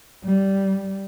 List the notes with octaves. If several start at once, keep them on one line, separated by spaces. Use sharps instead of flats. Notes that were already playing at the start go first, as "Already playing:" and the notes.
G3